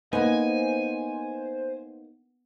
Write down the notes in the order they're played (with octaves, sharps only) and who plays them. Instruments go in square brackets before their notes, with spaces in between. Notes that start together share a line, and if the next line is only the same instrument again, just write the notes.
[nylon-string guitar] A#3 D#4 [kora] B3 [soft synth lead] C5 [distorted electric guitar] G#5